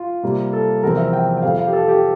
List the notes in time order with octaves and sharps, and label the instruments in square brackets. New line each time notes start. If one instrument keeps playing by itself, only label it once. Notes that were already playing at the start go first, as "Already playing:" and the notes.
Already playing: [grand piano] F4
C3 G3 A#3
A4
E2 C3 F3 C4 A#4
E5
G5
G5
F2 C3 F3 C4 F5
F5
G4
A4
G4